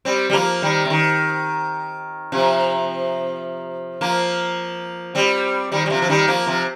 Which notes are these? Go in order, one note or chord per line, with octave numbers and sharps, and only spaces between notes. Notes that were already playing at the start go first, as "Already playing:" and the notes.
G3 C4
G3
F3 A#3
D#3 G3
C3
D#3
C3 F3
F3 A#3
G3 C4
D#3 G3
G3
C3 F3
F3
D#3 G3
F3 A#3
C3 F3